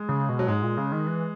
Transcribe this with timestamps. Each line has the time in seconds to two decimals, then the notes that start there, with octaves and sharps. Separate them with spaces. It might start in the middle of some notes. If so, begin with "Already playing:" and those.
Already playing: G#3
0.09 C#3
0.29 B2
0.39 F#3
0.47 G#2 G#3
0.62 A#2
0.77 C#3
0.92 D#3
1.07 E3